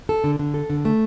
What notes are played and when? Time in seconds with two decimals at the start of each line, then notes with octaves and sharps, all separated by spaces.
0.09 A4
0.24 D3
0.39 D3
0.54 A4
0.70 D3
0.85 A3